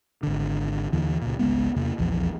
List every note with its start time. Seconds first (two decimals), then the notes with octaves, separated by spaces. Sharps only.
0.23 G#1 D3
0.93 D#2 D3 E3
1.22 C#2 A#2
1.39 G#1 C#2 G#3 B3
1.76 E2 C3 A#3
1.98 D#1 A#1 E2 F3